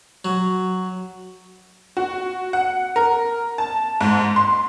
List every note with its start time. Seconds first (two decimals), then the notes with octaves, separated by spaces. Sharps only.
0.25 F#3
1.97 F#4
2.53 F#5
2.96 A#4
3.58 A5
4.01 G#2
4.36 C6